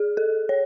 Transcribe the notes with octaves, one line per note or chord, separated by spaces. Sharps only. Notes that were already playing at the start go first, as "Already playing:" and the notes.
Already playing: G#4
A4
C#5